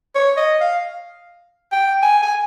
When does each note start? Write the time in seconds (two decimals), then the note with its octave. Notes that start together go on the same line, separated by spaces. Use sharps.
0.15 C#5
0.37 D#5
0.61 F5
1.72 G5
2.03 G#5
2.23 G#5